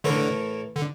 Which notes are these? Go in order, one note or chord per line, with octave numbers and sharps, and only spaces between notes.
A2 D3 E3 A3 E4 A#4
D3